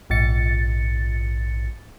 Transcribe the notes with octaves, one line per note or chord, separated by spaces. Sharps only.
A#1 G#2 A6 C#7